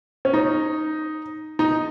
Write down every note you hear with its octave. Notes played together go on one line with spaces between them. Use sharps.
C#4
D#4
D#4